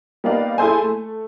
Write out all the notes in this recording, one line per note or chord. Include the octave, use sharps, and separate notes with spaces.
G3 A#3 B3 D#4 D5 F5
E4 G#4 A4 C5 G#5
A3